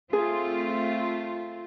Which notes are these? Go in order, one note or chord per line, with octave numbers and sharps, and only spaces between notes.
A3 C4 F4 G#4